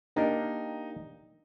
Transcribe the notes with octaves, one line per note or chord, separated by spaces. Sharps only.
A#3 D4 D#4 G4 A#4